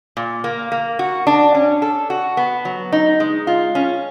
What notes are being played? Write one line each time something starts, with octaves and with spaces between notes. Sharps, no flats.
A#2
A#3
A#3
F#4
D4
C#4
A4
F#4
B3
F#3
D#4
G#3
F4
C#4